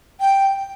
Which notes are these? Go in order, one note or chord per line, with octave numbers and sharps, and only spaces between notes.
G5